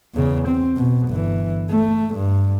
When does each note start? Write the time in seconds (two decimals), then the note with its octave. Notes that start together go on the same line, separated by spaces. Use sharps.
0.14 E2 C#3
0.48 C4
0.77 B2
1.09 G1 E3
1.69 A3
2.15 G2